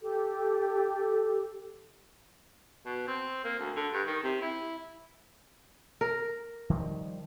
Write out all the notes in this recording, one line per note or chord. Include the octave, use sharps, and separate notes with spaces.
G4 A4
B2
C4
A#3
D2
D3
G2
D#3
C3
E4
A#4
D#3 F3 G3